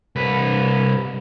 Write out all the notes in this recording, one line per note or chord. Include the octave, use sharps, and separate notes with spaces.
C2 B4